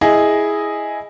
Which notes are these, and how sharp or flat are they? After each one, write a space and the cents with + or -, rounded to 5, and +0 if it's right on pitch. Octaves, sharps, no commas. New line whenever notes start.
E4 -5 G#4 +0 D#5 +0